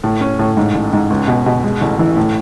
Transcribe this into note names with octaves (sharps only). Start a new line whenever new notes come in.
A2
C#4
A2
G#2
A1
G#2
C#2
B2
B2
G#3
A1
E3
A2